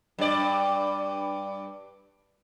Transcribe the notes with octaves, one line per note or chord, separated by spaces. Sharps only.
G2 D5